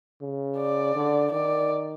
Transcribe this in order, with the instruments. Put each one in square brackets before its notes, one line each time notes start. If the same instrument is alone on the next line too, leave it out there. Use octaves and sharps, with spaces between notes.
[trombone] C#3
[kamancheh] D5
[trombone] D3
[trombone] D#3 [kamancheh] D5